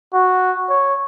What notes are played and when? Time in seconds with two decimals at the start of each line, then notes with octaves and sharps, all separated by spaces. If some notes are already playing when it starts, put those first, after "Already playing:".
0.14 F#4
0.69 C#5